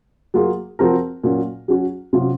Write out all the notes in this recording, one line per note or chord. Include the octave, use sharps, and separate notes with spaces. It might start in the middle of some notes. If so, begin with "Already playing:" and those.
F#3 A#3 F4 G#4
F3 C4 F#4 A#4
A#2 F#3 C#4
F#3 C#4 F#4
C3 F#3 C#4 F4